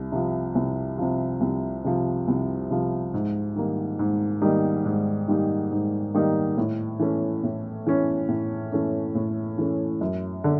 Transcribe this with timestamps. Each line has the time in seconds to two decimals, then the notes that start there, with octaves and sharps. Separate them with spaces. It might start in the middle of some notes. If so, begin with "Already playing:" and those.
Already playing: C2
0.12 C3 F3
0.55 C2
0.98 C3 F3
1.41 C2
1.84 C3 F3
2.28 C2
2.70 C3 F3
3.14 G#2
3.56 D#3 G3 A#3 D#4
3.99 G#2
4.42 D#3 G3 A#3 D#4
4.86 G#2
5.28 D#3 G3 A#3 D#4
5.72 G#2
6.14 D#3 G3 A#3 D#4
6.57 A2
7.00 E3 A3 C#4
7.44 A2
7.87 E3 A3 C#4
8.29 A2
8.72 E3 A3 C#4
9.15 A2
9.58 E3 A3 C#4
10.01 F#2
10.44 D3